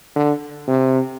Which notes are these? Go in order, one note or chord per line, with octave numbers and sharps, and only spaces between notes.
D3
C3